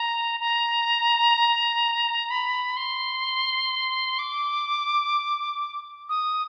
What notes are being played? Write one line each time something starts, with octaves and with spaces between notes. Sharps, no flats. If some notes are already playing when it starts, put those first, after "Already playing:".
Already playing: A#5
A#5
B5
C6
D6
D#6